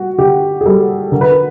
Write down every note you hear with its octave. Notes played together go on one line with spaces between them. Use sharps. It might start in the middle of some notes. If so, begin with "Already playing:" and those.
Already playing: G3 F#4
D3 G4
G#4
G3 A4
D3 A#4
B4
A#4